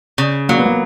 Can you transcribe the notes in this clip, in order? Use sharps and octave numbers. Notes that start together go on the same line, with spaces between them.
C#3
F#3 A#3
B3
A#3